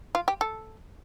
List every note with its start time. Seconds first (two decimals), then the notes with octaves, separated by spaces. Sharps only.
0.15 F4
0.28 G4
0.41 A4